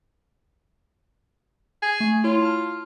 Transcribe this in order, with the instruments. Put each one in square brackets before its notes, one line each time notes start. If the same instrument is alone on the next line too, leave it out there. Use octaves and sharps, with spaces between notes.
[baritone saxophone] G#4
[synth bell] A3
[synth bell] E4 C#5 [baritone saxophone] F4
[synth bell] A5 F6